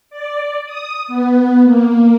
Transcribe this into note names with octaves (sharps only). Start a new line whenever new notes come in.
D5
D#6
B3
A#3